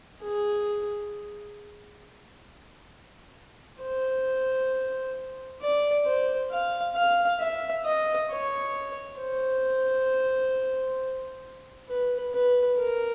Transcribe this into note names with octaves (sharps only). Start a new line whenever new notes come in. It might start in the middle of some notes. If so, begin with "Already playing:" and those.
G#4
C5
D5
C5
F5
F5
E5
D#5
C#5
C5
B4
B4
A#4